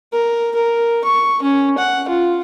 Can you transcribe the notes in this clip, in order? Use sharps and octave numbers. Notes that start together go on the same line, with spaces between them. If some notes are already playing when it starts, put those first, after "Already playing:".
A#4
A#4
C#6
C#4
F#5
F4